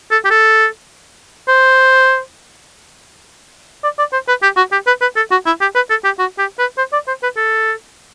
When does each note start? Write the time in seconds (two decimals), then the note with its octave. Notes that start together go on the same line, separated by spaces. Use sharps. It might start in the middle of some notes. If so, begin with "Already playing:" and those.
0.11 A4
0.25 G4
0.30 A4
1.48 C5
3.84 D5
3.99 D5
4.13 C5
4.28 B4
4.43 G4
4.57 F#4
4.72 G4
4.87 B4
5.01 B4
5.16 A4
5.31 F#4
5.46 E4
5.61 G4
5.75 B4
5.90 A4
6.04 G4
6.19 F#4
6.39 G4
6.59 B4
6.78 C5
6.93 D5
7.08 C5
7.23 B4
7.37 A4